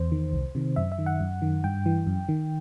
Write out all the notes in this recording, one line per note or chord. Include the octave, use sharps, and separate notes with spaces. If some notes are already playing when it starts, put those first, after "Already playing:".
Already playing: E2 C5
D#3
C2
C3 D#3
F#2 E5
E5
D#3
F#5
F#2
D#3
G2 G5
E3
F#2
D#3